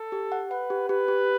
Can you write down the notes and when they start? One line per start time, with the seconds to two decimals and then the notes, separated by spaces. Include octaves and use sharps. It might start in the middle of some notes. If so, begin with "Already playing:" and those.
Already playing: A4
0.12 G4
0.32 F#5
0.51 B4 F#5
0.70 G4
0.89 G4 B4
1.08 G4